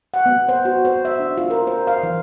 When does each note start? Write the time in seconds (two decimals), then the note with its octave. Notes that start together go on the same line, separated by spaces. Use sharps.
0.14 F#5
0.26 B3
0.49 C5
0.65 F#4
0.85 C5
1.05 E5
1.19 D4
1.38 F4
1.50 A#4
1.67 C5
1.87 F5
2.03 E3